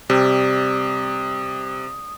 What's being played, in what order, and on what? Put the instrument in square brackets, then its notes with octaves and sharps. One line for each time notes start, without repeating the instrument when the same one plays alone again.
[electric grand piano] C3 [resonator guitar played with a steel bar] G3 [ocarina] D#6